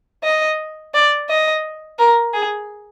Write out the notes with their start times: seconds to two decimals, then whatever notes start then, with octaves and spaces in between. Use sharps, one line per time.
0.24 D#5
0.94 D5
1.29 D#5
1.99 A#4
2.34 G#4